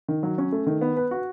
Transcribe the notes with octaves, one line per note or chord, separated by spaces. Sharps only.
D#3
F#3
C#4
A3
D#3
B3
B4
F#4